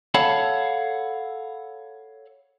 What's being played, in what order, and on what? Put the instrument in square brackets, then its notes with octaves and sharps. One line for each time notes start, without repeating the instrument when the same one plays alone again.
[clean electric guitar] A4 C#5 F5 F#5 A5 B5